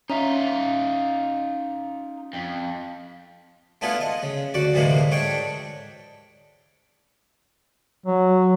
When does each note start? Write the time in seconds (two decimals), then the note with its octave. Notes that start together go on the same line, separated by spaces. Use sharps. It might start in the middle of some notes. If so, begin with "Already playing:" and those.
0.10 C#4 D#4 F4 E5 A#5
2.33 F2
3.81 A3 B3 D4 E4 F4 G#4
4.01 D#5
4.22 C#3
4.54 D2 F#4 D5
4.74 D2 A2 C3 E3 G#3 A#3
5.11 G#2 D4 C#5 G5
8.06 F#3